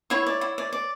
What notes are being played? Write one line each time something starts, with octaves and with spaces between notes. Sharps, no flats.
E4 C#5 C#6
D5
E4
D5
D5